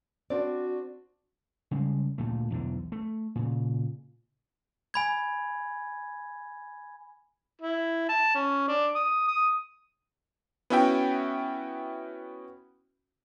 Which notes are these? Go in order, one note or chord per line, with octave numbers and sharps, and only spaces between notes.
C4 D4 F#4 D5
C#3 G3 G#3
D2 A#2 A3
B1 E2 G#2 D3
A3
A#2 C#3
G#5 B5 G#6
E4
A5
C#4
D4
D#6
D#6
B3 C#4 E4 F#4 E5 G5